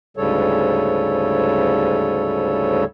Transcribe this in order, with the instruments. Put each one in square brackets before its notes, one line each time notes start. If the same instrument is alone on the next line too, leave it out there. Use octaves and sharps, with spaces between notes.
[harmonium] D2 G#2 C#3 G3 A4 C#5